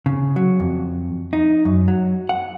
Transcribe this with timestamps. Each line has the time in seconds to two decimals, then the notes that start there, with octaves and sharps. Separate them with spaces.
0.06 C#3
0.36 F#3
0.60 F2
1.33 D#4
1.65 F#2
1.88 F#3
2.29 F#5